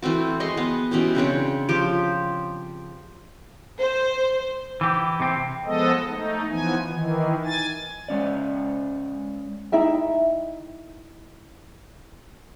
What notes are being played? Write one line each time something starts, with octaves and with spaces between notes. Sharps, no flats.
E3 A3 C4 F#4
G#3 D#5 C6 C#6
B3
B2 E3 C#4 G4
C#3 C4 D4 C#5
F3 G4
C5
E3 G4
C3 C4
F3 G#3 B3 A4 D#5
A3 D#4
E3 F3 B3 G#5
D#3 E3
G#5 A6
G#3 C#4 D5
D#4 E4 E5 G5